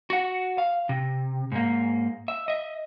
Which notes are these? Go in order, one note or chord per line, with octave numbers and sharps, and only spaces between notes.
F#4 F#5
F5
C3
G#2 A#3
E5
D#5 E5